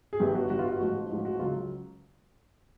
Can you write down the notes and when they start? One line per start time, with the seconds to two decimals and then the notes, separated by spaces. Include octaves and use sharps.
0.13 G#4
0.20 G1 G2 D#3 G3 G4
0.35 F#4
0.50 G1 G2 D#3 G3 F#4
0.59 F4
0.68 F#4
0.79 A1 G#2 F3 F#4
1.09 A1 G#2 F3 F#4
1.25 F#4
1.39 C#2 C#3 F#3 F4